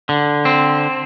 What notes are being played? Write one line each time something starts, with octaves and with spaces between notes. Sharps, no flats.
D3
C4